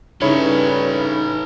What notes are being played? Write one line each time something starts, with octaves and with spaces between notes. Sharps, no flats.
G2 C#3 D#4 E4 A4 B4 C#5